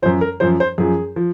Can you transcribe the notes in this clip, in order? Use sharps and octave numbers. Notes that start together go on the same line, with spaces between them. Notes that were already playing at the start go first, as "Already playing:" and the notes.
F#2 F3 C5
A#4
F#2 F3 C5
C5
F#2 F3 G#4
F3